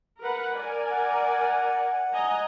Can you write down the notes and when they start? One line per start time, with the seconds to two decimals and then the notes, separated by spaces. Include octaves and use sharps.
0.20 A#4 B4 F#5
0.58 A#4 D5 G#5
0.91 F#5
2.13 D#5 G#5 A#5